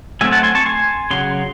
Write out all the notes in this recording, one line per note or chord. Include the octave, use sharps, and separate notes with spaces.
F#3 A3 C4 E5 G#5
F#5 A5
G#5 C6
A5 C#6
G#5 C6
C#3 F#3 C6